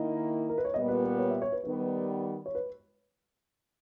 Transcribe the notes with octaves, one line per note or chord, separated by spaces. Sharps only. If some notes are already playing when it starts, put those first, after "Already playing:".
Already playing: D#3 A#3 E4 D#5
A#4
B4
C#5
A#2 G3 B3 D#5
B4
B4
C#5
E5
C#5
B4
D#3 G3 B3 B4
C#5
B4